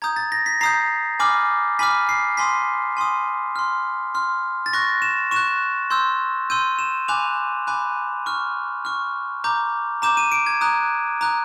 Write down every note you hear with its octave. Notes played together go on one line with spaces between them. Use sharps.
A#5 D#6 G6 G#6
A6
A#6
B6
A#5 D#6 G6 C7
G#5 B5 D6 F6
G#5 B5 D6 F6 B6
C7
G#5 C6 D#6 B6
G#5 C6 D#6
C6 F6
C6 F6
A6
C#6 F#6 A#6
E7
C#6 F#6 E7
C6 E6 G6
C6 E6 G6 D#7
E7
G#5 B5 D6 F#6 F7
G#5 B5 D6 F#6
C#6 F6
C#6 F6
A#5 D6 G6
A#5 D6 G6 E7
D#7
D7
G#6
A#5 D#6 F#6
A#5 D#6 F#6